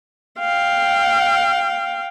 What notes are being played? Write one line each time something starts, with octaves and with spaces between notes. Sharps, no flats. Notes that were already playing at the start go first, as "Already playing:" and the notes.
F5 G5